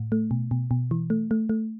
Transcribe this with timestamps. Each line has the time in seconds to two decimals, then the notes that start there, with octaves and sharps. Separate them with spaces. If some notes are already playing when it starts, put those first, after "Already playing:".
Already playing: A2
0.12 A3
0.31 B2
0.51 B2
0.71 B2
0.91 E3
1.10 A3
1.31 A3
1.49 A3